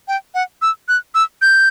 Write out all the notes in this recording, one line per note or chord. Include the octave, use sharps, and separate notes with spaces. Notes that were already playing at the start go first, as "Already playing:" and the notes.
G5
F#5
E6
F#6
E6
G6